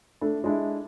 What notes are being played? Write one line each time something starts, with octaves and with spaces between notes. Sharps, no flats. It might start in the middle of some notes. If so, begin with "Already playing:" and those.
A3 D4 A4
G#3 D4 E4